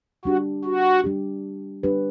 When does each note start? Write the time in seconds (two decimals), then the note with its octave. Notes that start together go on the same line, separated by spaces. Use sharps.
0.25 G3 D4 F#4 G4
0.64 F#4
1.04 G3 D4 G4
1.83 G3 D4 G4 B4